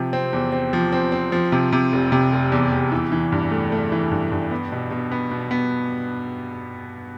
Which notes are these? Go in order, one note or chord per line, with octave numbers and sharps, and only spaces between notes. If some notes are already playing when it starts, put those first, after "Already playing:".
Already playing: C3 F3
C4
E2
C4
F3
C4
C4
F3
C3
C3
F1
C3
F1
E2
E2
E3
E3
G2
A3
A3
E3
G2
G2
B3
B2
B2
B3
B2
B3